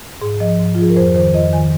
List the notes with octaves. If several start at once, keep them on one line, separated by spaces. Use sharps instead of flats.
G#2 G#4
F3 D#5
G#2
F4
F3 G#4
A#4
F2 C5
D#3 C5
F2 D#5
D#3 G#5